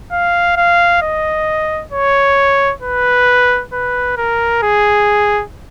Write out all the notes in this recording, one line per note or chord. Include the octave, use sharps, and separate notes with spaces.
F5
F5
D#5
C#5
B4
B4
A#4
G#4